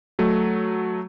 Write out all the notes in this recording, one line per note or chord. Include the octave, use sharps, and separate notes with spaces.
F#3 A3